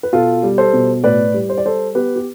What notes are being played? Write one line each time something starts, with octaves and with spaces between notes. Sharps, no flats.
B4
B2 F4 A4
G3
A4 C5
B2
A2 B4 D5
G3
C5
D5
G3 A4 C5
B3 G4 B4
G4